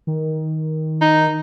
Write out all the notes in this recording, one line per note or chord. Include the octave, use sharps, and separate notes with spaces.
D#3
D#4